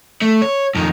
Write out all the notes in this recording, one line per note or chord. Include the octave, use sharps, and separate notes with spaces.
A3
C#5
F2 D#3